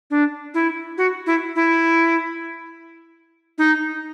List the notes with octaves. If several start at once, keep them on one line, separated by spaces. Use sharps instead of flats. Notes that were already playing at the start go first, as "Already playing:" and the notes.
D4
E4
F#4
E4
E4
D#4